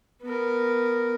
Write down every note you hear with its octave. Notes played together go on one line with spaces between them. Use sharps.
B3 A#4